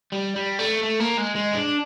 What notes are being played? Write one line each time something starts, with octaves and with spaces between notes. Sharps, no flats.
G3
G3
A3
A3
A#3
G#3
G#3
D4